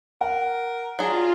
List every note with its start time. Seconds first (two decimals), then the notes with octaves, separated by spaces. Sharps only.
0.21 A#4 F#5
0.99 F#3 D4 F4 G#4